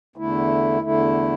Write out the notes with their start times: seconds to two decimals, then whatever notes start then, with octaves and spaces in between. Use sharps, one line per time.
0.16 E2 D3 A3 E4
0.81 E2 D3 A3 E4